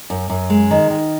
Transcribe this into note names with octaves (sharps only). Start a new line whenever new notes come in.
F#2
F#2
G#3
D#3
D#3